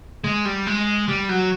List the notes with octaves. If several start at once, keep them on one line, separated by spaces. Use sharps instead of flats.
G#3
G3
G#3
G3
F#3